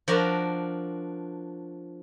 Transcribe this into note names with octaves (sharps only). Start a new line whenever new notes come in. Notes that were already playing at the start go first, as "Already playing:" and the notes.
F3 D4 F#4 A#4